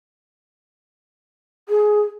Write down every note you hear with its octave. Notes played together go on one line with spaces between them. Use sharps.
G#4